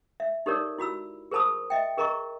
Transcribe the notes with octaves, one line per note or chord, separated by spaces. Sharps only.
E5
D#4 G4 A4 A#4 C#5 D5
E4 F#4 B5 E6
G#4 A#4 C5 A5 B5 D#6
D#5 E5 G5
G#4 A#4 D#5 A#5 C#6